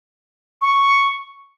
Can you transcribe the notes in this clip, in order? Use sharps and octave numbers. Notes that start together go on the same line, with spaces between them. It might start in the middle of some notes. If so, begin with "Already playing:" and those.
C#6